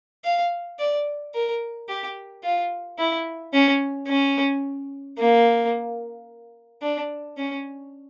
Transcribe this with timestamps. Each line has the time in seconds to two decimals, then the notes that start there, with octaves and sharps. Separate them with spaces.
0.24 F5
0.79 D5
1.34 A#4
1.89 G4
2.43 F4
2.98 E4
3.53 C#4
4.08 C#4
5.18 A#3
6.82 D4
7.37 C#4